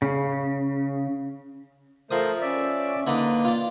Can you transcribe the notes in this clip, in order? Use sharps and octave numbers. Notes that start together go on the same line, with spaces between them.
C#3
F3 A3 A#4 C5 D#6
C#4 D5 E5
D3 A#3 D4 D#4 B4
F4 D5